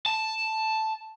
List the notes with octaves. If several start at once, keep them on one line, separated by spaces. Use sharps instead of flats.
A5